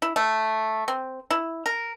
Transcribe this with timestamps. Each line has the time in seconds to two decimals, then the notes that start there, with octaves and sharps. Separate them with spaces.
0.02 E4
0.16 A3
0.88 C4
1.31 E4
1.66 A#4